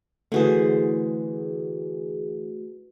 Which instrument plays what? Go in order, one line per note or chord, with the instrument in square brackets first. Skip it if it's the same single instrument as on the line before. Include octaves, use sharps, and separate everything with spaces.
[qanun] D3 E3 C5 [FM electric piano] A3 F#4 G#4